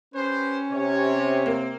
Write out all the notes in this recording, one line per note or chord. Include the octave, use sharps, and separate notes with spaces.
C#4 G4 B4 C5
C3 C#5
A#3 C4